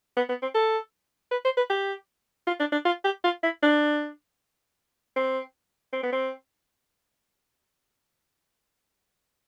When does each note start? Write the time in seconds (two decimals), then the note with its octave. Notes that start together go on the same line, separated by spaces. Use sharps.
0.17 B3
0.29 B3
0.42 C4
0.55 A4
1.31 B4
1.45 C5
1.57 B4
1.70 G4
2.47 F4
2.60 D4
2.72 D4
2.85 F4
3.05 G4
3.24 F4
3.43 E4
3.63 D4
5.16 C4
5.93 C4
6.03 B3
6.13 C4